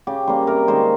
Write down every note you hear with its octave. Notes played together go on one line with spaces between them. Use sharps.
C#3 G4
G3 A#3 C#4 C5
C3 A#4
D#3 G#3 C#4 C5